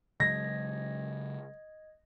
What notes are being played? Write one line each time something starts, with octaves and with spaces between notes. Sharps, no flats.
C#3 F#3 G#3 D#5 G#6 A#6